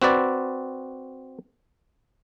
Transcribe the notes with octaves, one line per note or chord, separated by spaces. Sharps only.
C4 F#4 B4 D5